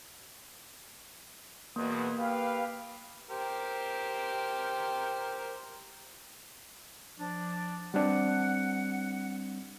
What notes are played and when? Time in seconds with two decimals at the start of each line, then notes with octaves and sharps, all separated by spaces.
1.76 E2 B2 A#3
2.18 G4 B4 F5
3.30 G4 A#4 C5
7.18 F3 D4
7.94 G3 C4 D4 F#5